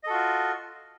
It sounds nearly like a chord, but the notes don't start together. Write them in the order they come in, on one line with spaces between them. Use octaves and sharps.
D#5 A4 F#4 F4